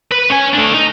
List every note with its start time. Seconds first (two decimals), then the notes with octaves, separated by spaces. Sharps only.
0.11 B4
0.30 C#4 G#5
0.54 A3 D4
0.74 D#4